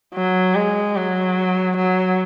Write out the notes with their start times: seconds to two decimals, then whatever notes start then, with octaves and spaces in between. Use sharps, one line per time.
0.15 F#3
0.55 G#3
0.96 F#3
1.77 F#3